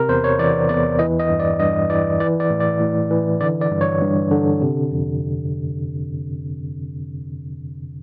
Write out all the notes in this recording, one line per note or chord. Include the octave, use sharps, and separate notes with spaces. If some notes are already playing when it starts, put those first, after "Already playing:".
Already playing: C3 A#4
E2 C5
C#5
E3 D5
E2 D5
E3 D#5
D#5
G2
D5
G2 D#5
E3 D5
E3 D5
D5
A2
D5
A2
E3
D3 D5
D5
G2
C#5
G2
D3
C3
F2